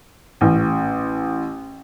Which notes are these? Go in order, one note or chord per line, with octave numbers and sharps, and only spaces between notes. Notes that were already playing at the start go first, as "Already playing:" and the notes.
A1